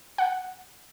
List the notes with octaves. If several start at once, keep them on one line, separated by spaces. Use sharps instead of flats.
F#5